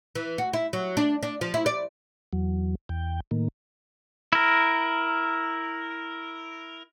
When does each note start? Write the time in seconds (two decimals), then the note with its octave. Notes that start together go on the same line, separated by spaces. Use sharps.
0.15 E3
0.38 F#4
0.53 E4
0.73 F#3
0.97 D4
1.23 D4
1.41 F3
1.54 E4
1.66 D5
2.33 E2 F#3
2.89 E2 G5
3.31 A2 D#3 A#3
4.33 E4 A#4